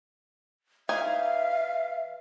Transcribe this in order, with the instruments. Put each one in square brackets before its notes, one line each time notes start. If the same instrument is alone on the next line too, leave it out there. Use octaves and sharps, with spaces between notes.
[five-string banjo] E3 D#4 G#5 [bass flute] E5 [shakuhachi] F5